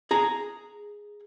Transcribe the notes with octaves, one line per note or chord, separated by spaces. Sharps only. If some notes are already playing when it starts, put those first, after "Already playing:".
G#4 A#5